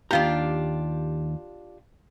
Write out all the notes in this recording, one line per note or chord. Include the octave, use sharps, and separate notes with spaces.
D#2 G#2 D4 F4 G4 A#5